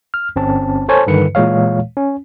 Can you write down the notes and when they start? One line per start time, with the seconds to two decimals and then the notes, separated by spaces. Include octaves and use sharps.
0.14 F6
0.36 G1 C4 C#4 A5
0.89 A4 C5 C#5 G#5 A5
1.07 G2 D3 D#3 B4 C#7
1.35 A#2 E3 G#3 C#5 F5
1.97 C#4